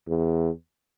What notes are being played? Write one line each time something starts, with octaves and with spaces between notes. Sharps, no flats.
E2